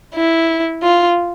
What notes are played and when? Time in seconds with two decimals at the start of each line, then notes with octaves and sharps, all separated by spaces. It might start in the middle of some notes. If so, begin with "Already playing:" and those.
0.15 E4
0.82 F4